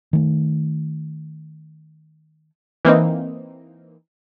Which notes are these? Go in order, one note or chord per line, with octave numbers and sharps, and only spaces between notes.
D#3 A3
E3 A#3 C4 D#4